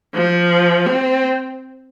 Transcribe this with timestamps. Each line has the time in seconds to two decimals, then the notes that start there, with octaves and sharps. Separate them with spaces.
0.14 F3
0.86 C4